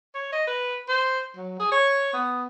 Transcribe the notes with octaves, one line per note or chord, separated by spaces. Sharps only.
C#5
D#5
B4
C5
F#3
G#4
C#5
B3